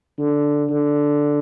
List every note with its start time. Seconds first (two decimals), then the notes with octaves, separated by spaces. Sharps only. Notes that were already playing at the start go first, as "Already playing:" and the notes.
0.19 D3
0.70 D3